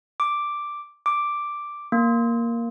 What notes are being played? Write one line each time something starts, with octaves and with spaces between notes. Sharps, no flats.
D6
D6
A#3